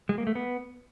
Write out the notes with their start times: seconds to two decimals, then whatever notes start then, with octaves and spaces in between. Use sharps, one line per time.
0.09 G#3
0.18 A#3
0.27 A3
0.35 B3